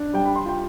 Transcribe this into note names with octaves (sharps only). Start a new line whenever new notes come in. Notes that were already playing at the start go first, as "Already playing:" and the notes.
Already playing: D4
G3 G5
B5
C6
F4 G5